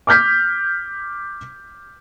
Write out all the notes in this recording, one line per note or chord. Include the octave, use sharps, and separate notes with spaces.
D6 F6 G6 B6